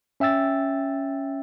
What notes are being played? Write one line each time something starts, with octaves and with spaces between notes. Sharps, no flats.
C#4 E5 G5 E6 A6